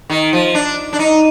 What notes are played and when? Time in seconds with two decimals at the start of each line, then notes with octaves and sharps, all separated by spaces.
0.10 D#3
0.33 F3
0.55 D4
0.93 D4
0.99 D#4